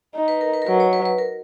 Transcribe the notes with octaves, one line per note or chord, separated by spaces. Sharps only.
D#4
B4
A#4
B4
A#4
F#3 B4
C#5
B4
B4
A#4